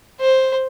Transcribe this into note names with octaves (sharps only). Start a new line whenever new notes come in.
C5